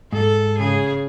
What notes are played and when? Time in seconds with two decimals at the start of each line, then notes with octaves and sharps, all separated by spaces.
0.13 G#2 A4
0.59 C#3 G#4